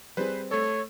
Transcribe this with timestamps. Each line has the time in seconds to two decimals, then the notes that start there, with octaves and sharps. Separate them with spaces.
0.17 G3 C4 G#4 B4 C5
0.51 A3 A4 C#5